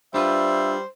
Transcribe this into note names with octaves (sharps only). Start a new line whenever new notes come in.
G3 D4 F4 B4 C5 E5